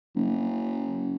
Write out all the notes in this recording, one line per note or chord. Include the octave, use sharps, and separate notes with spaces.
F#1